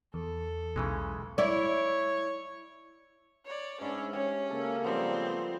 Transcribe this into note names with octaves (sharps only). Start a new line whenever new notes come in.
E2 A4
B1 C#3 E3 G#3
E4 C#5 D5
C#5 D5
G#2 C#4 D4 E5 B5
C#4 G4 G#4 C#5
C#3 A#3 A4
F3 G3 B3 C4